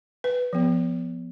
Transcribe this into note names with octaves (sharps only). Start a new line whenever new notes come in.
B4
F3 B3